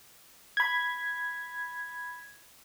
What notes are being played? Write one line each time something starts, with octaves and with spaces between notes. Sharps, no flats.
B5 G#6